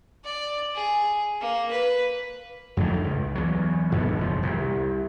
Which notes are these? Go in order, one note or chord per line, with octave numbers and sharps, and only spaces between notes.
D5
G#4
A#3
B4
F2 A2 D3 D#3
C#2
E2 F#3
G#2 B2 D3 B3
F#1 D#2 F3
C2